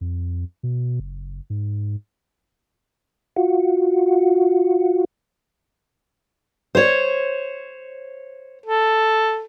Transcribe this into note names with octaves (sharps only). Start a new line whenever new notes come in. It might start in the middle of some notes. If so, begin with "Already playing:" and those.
F2
B2
F#1
G#2
F4 F#4
C5 C#5
A4